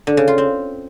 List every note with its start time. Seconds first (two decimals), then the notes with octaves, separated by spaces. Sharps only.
0.07 D3
0.17 C#3
0.28 F4
0.38 C4